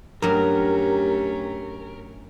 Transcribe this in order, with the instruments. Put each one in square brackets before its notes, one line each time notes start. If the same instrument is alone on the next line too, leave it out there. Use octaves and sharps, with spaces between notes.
[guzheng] G2 F#3 [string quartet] A3 C#4 [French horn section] G4 [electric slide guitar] A#4